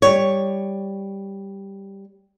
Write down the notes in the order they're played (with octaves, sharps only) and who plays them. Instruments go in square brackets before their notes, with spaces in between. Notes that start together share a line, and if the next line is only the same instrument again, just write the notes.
[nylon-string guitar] G3 C#5